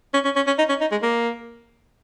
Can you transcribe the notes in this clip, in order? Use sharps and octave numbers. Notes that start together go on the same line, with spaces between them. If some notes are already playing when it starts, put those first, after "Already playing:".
C#4
C#4
C#4
C#4
D#4
C#4
D#4
G#3
A#3